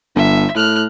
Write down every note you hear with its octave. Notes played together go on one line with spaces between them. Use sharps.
G1 E5
A2 F6 F#6